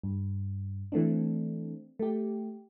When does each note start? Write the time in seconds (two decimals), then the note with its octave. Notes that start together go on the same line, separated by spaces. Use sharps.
0.03 G2
0.92 E3 A3 C4 D4
1.99 A3 G4